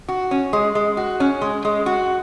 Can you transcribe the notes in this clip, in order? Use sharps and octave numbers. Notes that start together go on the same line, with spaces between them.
F#4
C#4
G#3
G#3
F#4
C#4
G#3
G#3
F#4